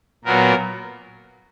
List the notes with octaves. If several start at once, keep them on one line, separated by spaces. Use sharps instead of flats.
A#2 F#3 A#3 B3 A#4